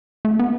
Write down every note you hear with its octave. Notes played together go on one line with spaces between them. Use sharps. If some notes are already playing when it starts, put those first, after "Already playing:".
A3
B3